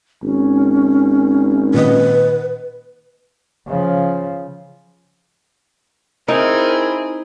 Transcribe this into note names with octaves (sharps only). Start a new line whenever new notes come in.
G#1 C#4
A#2 D#3 B4 D#5
C#3 F3
C4 D#4 E4 G#4 A#4